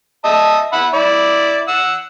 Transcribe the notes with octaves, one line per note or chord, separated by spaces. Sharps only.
D#5 E5 A5
E5 F#5 B5
E4 D5
F#5 E6